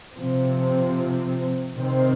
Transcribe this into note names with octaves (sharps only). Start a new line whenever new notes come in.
C3 F3 C4
C3 D#3 C4